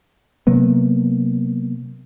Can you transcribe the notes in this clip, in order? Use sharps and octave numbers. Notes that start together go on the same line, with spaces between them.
C3 F#3 A#3 B3